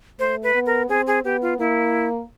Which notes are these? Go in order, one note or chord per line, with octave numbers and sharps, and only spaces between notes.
A3 C5
B4
B3
A#4
C4 G#4
G#4
B3 G4
F4
A#3 E4